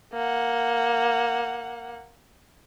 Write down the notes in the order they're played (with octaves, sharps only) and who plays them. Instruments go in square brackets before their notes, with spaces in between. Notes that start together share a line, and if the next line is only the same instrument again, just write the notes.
[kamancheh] A#3 F#5